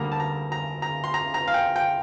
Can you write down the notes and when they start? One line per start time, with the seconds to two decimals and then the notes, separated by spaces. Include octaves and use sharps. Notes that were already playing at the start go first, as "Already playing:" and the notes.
Already playing: D2 D3 G3 A#3 A#5
0.12 A5
0.20 A#5
0.52 A#5
0.82 A#5
1.04 C6
1.14 A#5
1.34 A#5
1.48 F5
1.54 G5
1.76 G5